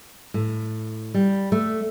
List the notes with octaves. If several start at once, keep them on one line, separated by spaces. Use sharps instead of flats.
A2
G3
A3